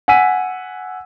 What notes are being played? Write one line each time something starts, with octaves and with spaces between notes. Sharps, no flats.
F#5 G#5 E6 B6 D#7